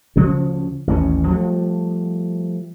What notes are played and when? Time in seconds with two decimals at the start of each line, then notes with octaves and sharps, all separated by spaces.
0.16 D2 C#3 F3 C#4
0.87 A1 D#2 E3 C#4
1.27 F3 G3 A3